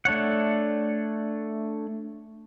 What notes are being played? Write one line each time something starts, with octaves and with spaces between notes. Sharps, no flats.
A3 D4 C#5 F#5